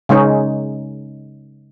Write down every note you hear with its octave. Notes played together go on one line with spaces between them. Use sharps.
C#3 G#3 C#4 D#4